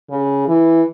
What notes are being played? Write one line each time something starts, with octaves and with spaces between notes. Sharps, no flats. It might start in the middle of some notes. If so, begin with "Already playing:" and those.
C#3
E3